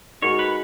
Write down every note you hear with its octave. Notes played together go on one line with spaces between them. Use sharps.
G#3 D#4 F#4 A#4 C#5
B4